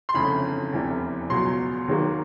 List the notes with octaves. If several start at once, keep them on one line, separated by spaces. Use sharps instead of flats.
C6
G1 F2 C#3 E3 A3 B5
F1 E2 C3 E3 G3
C#2 B2 F#3 C6
D#2 D#3 F#3 A#3